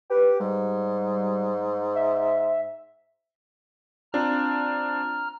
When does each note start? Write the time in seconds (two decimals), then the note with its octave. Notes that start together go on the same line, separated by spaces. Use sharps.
0.10 G4 B4
0.40 G#2 G3
1.95 E5
4.14 C4 D4 F4 A#5 F6